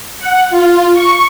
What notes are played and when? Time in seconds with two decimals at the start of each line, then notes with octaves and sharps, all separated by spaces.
0.19 F#5
0.50 F4
0.93 C#6